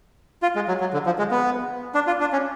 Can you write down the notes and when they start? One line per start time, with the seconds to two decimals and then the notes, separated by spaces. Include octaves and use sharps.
0.42 F4
0.55 G#3
0.68 F#3
0.80 F#3
0.93 D3
1.06 F3
1.18 G#3
1.31 B3
1.95 D4
2.07 F4
2.21 D4
2.32 C#4